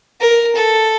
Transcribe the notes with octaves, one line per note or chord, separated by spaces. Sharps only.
A#4
A4